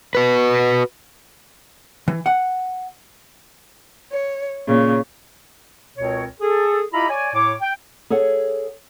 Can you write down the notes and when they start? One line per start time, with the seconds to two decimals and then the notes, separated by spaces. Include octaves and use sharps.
0.15 F#4 B4
2.08 E3
2.26 F#5
4.11 C#5
4.66 A#2 C#3
5.97 C#2 B2 C4 A#4 C#5
6.40 G#4 A4
6.93 E4 F4 G4 D#5 A#5 B5
7.09 C#5 D5 G#5
7.34 A2 C#5 D6
7.61 G5
8.10 G#4 A4 C#5 F#5